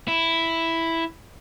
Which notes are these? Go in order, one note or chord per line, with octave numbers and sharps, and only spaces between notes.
E4